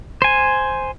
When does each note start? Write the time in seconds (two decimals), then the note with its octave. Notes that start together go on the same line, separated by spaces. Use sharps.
0.22 C5 G#5